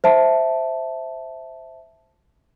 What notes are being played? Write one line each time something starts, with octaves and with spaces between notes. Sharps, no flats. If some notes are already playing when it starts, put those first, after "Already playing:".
C5 E5 A5